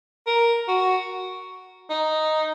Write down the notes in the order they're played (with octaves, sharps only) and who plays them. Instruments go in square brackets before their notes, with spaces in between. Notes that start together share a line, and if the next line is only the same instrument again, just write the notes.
[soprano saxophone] A#4
F#4
D#4